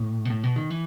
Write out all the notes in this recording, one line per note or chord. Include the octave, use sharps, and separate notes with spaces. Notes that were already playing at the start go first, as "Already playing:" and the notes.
Already playing: A2
B2
A2
B2
D#3
E3